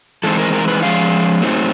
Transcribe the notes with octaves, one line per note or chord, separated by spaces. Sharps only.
E3 G#3 C4 D#4 A4
A#4
A#4
B4
F3 G#3 C#4 F5
A2 F#3 A3 C4 D#4